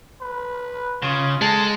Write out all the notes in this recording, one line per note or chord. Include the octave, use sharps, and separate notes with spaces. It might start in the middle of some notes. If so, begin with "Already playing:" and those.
B4
C#3 F4
G#3 A4 A5